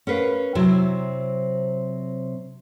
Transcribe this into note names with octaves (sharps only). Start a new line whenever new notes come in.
C#4 A#4 B4 F5
C3 F#3 C4 E4